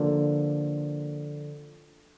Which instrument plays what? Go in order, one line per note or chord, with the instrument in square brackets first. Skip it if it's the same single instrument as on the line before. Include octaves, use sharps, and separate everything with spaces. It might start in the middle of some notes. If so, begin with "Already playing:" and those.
Already playing: [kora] D3 F3 A#3